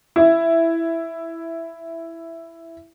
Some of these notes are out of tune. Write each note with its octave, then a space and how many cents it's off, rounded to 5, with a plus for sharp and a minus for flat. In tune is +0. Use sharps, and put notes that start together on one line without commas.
E4 +5